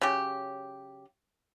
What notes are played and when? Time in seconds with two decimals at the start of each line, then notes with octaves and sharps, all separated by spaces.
0.01 C#3 F#3 G4